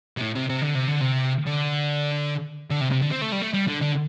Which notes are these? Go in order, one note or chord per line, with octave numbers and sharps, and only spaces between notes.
C3
A2
C3
C3
D3
C3
D3
C3
D3
D3
C3
C3
D3
C4
A3
G3
A3
G3
D3
D3